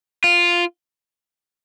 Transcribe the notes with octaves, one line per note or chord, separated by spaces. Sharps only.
F4